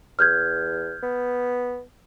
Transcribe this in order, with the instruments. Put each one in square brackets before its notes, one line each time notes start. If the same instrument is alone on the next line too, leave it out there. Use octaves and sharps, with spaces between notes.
[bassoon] E2 [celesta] F6 G6 G#6
[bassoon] B3